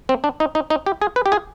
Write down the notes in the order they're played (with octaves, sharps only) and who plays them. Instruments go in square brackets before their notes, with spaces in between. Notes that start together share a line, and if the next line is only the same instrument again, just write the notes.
[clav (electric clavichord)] C4
D4
D#4
D#4
D#4
G4
G#4
B4
G4
G#4